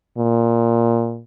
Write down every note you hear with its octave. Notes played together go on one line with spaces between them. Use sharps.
A#2